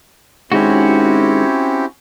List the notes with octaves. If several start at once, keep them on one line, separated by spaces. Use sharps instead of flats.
G#2 D#3 G#3 C4 C#4 E4 F#4 G4